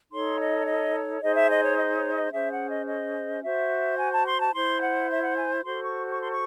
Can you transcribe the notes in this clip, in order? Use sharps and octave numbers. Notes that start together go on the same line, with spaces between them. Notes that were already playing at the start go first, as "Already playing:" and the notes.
D#4 A4 C#5 C6
D#5
D#5
D#4 G#4 C5 D#5
E5
D#5
C#5
D#5
C#5
D#5
C#4 G#4 C5 E5
F#5
D#5
D#5
F#4 C5 E5
G#5
A5
C6
A5
E4 C5 C6
F#5
E5
F#5
G#5
F#4 A4 C5 C6
C#6
C#6
C6
C#6